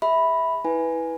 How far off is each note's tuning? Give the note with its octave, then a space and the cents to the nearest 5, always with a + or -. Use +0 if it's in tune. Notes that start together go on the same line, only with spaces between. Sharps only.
G#4 -45 E5 -15 B5 +0
E4 -20 B4 +0 G#5 +0